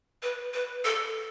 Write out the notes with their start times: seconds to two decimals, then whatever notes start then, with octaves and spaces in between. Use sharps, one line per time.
0.23 B4
0.54 B4
0.85 A4